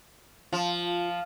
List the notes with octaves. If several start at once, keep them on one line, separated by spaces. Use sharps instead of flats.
F3 F4